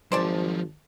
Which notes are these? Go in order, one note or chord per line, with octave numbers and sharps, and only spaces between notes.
G#1 F3 F#3 C5 D5 A5